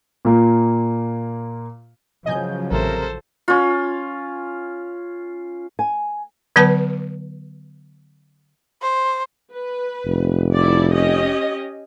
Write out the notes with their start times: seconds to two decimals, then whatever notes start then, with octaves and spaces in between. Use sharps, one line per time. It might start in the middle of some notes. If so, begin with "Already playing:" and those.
0.25 A#2 A#3
2.26 C#3 F3 F#3 D#5 G#5 G6
2.71 A1 C3 A4 A#4 C5
3.48 C#4 F4
5.79 G#5
6.56 D3 F#3 B3 B4 A5
8.82 C5
9.53 B4
10.05 F1
10.54 E4 A4 D5
10.93 C#4 G4 D#5